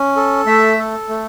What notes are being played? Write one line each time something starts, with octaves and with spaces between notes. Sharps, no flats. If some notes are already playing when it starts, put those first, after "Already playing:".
Already playing: C#4
A4
A3 E5
A4
A3